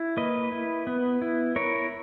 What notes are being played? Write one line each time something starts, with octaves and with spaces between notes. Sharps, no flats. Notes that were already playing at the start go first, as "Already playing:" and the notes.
Already playing: E4
A#3 B4 D#5
E4
B3
E4
E4 A#4 C#5